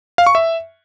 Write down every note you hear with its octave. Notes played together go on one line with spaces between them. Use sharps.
F5
C#6
E5